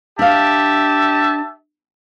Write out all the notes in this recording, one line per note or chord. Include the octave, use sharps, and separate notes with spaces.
D4 G4 E5 F5 A5